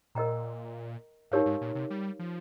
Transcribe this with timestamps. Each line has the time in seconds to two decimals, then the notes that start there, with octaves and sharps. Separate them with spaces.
0.15 A#2 A#4 D#5 G5 A#5
1.31 G#2 D#4 G4 A#4 C#5 F5
1.46 G#2
1.61 A#2
1.75 C3
1.90 G3
2.19 F3